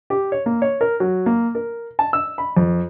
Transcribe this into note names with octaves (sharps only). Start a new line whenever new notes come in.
G4
C#5
A#3
C#5
A#4
F#3
A#3
A#4
A5
E6
B5
F2